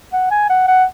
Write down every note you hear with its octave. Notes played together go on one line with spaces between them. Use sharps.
F#5
G#5
F#5
F#5